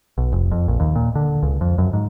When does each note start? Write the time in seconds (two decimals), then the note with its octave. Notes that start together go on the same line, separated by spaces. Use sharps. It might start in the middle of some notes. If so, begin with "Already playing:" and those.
0.18 B1
0.33 F1
0.52 F2
0.68 A#1
0.80 D#2
0.96 A#2
1.15 D3
1.43 C#2
1.61 F2
1.78 F#2
1.93 G#2